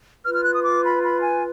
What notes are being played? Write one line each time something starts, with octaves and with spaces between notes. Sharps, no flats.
F4 B4 F6
F6
F#6
D#6
D6
B5
B5
G#5